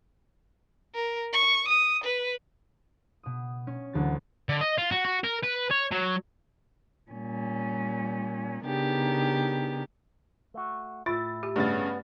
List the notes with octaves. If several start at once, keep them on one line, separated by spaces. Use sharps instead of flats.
A#4
C#6
D#6
B4
B2 D#6
C#4
D2 E3 F#3 A6
D3
D#5
F4
F#4
F#4
A#4
B4
C#5
F#3
A#2 G3 C#4
C#3 B3 D4 D#4 G4 A#4
A3 F#4
A2 E4 F4 A6
G4
G2 C#3 A3 B3 A6